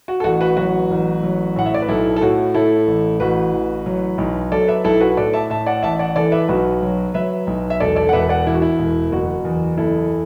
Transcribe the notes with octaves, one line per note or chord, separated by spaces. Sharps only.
F#4
A4
A1 F#4
F#4 B4
F#3 F#4 B4
A1
F#3
A2 F#5
E5
D5
B4
B1 E4 A4
A4
A2 F#4
A2 E4 A4
A1
A1 F#4 B4
E3
F#3
B1
F#3 A4 D5
B4 E5
B1 E4 A4
F#4 B4
A2 A4 D5
E5 A5
A2 E5 A5
D5 F#5
A1 E5 A5
D5 F#5
E3 A4 D5
B4 E5
B1 F#4 B4
F#3
F#3 B4 E5
B1
E5
E1 A4 D5
A4 D5
F#5
E1 B4 E5
D5 F#5
E2 E4
F#4
E4
E1
F#1 F#4
E2
F#1 E4 A4